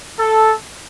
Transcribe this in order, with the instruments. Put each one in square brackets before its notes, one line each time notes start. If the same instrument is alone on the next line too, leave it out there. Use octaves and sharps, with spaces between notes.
[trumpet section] A4